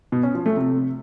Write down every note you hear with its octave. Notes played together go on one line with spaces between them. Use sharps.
B2
C#4
F3
A3
C3